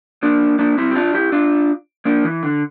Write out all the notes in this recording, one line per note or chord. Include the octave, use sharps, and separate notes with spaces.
A#3 D4
A#3 D4
C4 E4
G4
D4 F4
E4 G4
D4 F4
A#3 D4
E3
D3